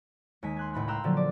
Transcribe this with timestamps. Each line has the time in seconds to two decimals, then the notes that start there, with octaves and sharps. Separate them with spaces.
0.43 D#2 G#3 G#5 B6
0.57 C6 F#6 G#6
0.73 C#2 A2 B5 F#6
0.87 F5 G5 A#5 C6 E6 F#6
1.04 A#2 D3 F3 F#3 A4
1.17 D5